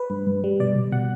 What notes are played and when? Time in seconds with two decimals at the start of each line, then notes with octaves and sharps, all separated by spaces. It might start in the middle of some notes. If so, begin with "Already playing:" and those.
Already playing: B4
0.10 G2
0.27 G2
0.44 G3
0.60 B2 D5
0.75 B2
0.92 B2 F#5